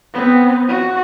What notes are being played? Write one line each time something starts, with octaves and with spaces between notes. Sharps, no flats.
B3 C4
F#4